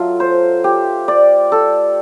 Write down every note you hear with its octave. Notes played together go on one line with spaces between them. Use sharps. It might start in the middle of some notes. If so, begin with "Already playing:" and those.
Already playing: F#3 A3 F4
C5
G4
D5
A4